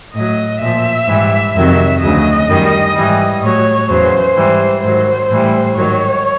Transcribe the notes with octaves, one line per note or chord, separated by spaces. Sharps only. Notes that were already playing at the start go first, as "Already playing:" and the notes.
A2 F#3 D#5
A#2 F3 E5
G#2 E3 G3
F2 C3 D#3 F#3 E5
D2 C#3 F#3 D#5
F#2 D#3 G3
G#2 E3 G3
A2 F#3 C#5
E2 C#3 F#3 C5
G#2 E3 G3
G#2 D#3 F#3 C5
A2 E3 G3
G#2 D#3 F#3 C#5